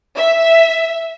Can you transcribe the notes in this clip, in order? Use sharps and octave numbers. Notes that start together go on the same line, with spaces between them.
E5